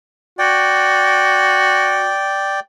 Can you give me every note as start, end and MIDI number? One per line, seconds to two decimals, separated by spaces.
0.39 2.14 66
0.39 2.60 74
0.39 2.60 79